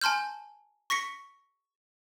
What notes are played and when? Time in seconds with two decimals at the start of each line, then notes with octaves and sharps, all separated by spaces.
0.01 G#5 A5 C6 F6 G6
0.90 C#6 A#6 B6 C#7